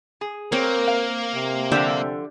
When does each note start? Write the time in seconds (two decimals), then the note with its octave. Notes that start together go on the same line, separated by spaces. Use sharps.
0.21 G#4
0.52 A#3 C4 A#4 C#5
0.88 F5
1.35 C3
1.72 D3 F3 D4 G4 E5